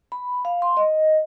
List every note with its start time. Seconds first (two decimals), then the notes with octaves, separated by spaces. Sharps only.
0.12 B5
0.45 F5
0.62 C6
0.77 D#5